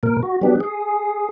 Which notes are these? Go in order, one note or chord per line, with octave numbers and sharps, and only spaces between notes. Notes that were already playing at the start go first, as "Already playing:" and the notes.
A#2 A#4
F#4
F#3 B3 D4 G4
G#4